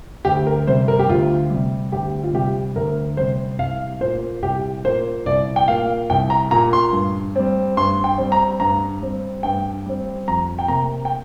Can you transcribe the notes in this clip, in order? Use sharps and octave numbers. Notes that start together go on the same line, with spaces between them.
D2 G4
A#4
C3 G3 C5
A#4
G4
D2 F4
C3 G3
D2 G4
F4
C3 G3 G4
D2 A#4
C3 G3 C5
C2 F5
A#2 A#3 C5
C2 G4
A#2 A#3 C5
C2 D5
G5
A#2 A#3 F5
C2 G5
A#5
A#2 A#3 A#5
C6
G2
G3 C4
G2 C6
G5
G3 C4
A#5
G2 A#5
G3 C4
G2 G5
G3 C4
F2 A#5
G5
C3 A#3 A#5
G5